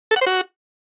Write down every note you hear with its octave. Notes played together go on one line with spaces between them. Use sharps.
A4
F#5
C5
F#4